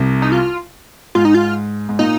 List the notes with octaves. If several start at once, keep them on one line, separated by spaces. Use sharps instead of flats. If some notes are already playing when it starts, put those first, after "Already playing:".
Already playing: C2 C3
D#4
F4
G#2 F4
D#4
F4
G#2
A#2 D#4